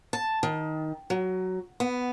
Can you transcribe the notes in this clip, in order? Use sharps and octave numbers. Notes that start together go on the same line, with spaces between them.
A5
D#3
F#3
B3